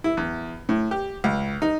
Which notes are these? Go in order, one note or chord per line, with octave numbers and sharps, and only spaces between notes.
E4
E2
A2
G4
C#2
D#4